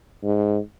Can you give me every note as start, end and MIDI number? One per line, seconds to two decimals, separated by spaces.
0.23 0.58 44